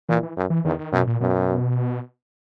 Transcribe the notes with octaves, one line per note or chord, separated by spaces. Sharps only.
A#2 E3
E3
F#2
E3
E2 D#3
D#3
F#2 B2
A#2
F#2 B2